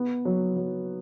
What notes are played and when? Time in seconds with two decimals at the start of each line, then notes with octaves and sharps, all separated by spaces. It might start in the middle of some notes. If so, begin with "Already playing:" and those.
Already playing: B3
0.25 F#3
0.56 F#3